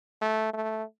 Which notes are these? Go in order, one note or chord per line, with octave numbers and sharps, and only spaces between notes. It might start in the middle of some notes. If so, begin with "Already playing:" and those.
A3
A3